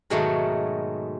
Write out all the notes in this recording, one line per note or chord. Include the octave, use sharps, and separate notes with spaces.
G#2 B2 D#3 F#3 G#3 A3